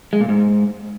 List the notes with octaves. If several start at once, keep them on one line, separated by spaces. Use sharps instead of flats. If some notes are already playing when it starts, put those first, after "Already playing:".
G#3
A#2
G#2